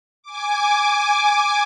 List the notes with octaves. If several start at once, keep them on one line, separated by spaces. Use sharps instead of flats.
G#5 D6